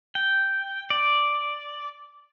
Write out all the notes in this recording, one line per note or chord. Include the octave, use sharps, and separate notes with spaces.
G5
D5